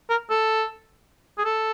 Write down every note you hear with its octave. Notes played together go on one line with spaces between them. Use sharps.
A#4
A4
G#4
A4